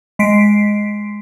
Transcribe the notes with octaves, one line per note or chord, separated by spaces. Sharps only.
G#3 B6 C7 D7